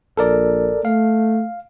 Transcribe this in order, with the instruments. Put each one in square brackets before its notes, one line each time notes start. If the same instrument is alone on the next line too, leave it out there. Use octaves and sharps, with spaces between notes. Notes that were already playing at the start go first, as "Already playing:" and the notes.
[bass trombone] A#1 [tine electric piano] A4 A#4 D5
[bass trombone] A3 [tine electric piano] F5